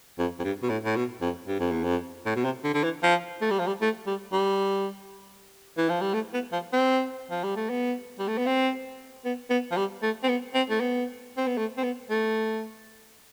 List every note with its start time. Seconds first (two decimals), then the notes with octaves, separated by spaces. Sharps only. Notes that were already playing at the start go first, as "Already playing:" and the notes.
0.19 F2
0.39 F2
0.44 G2
0.62 B2
0.69 A2
0.84 A2
0.96 B2
1.21 F2
1.48 G2
1.60 F2
1.72 E2
1.83 F2
2.25 A2
2.36 B2
2.44 C3
2.64 D3
2.74 D3
2.84 E3
3.03 F3
3.41 A3
3.51 G3
3.59 F3
3.67 G3
3.81 A3
4.07 G3
4.32 G3
5.77 E3
5.89 F3
6.01 G3
6.14 A3
6.33 B3
6.52 F3
6.73 C4
7.31 F3
7.43 G3
7.56 A3
7.69 B3
8.19 G3
8.28 A3
8.37 B3
8.46 C4
9.25 B3
9.50 B3
9.71 F3
9.77 G3
10.02 A3
10.23 C4
10.29 B3
10.54 C4
10.70 A3
10.80 B3
11.37 C4
11.47 B3
11.57 A3
11.77 C4
11.83 B3
12.10 A3